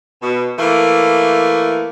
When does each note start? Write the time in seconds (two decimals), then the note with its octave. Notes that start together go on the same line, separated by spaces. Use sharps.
0.22 B2
0.58 E3 A3 A#3